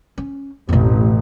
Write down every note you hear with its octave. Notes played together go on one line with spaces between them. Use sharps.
C#4
A1 F2 B2